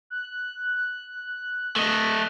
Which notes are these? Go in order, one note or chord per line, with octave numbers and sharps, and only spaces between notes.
F#6
A3 D#5